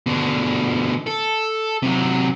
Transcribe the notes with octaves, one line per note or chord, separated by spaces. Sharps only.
B2 D3
A4
C3 F#3